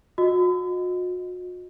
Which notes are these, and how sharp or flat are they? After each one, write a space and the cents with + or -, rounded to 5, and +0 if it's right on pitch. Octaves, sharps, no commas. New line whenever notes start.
F#4 -40 D#5 +0